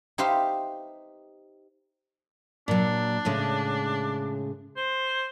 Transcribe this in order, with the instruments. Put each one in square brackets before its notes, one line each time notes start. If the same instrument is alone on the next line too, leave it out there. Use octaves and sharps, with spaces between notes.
[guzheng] D#4 G4 B4 C5 E5 F5
[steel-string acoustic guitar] A#2 F#3 [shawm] D4
[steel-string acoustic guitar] A2 C#3 G#3
[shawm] C5